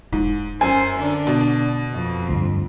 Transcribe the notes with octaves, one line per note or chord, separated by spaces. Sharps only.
E1 G#2
F#2 C5 G#5
D3 D4
B2
F2
D2 G2